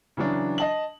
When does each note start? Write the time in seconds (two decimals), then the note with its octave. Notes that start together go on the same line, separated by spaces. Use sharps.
0.17 C#3 E3 F#3 D4
0.58 D#5 A5 F#7